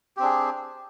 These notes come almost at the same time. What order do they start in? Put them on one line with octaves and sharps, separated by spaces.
G4 C4 D4 G#4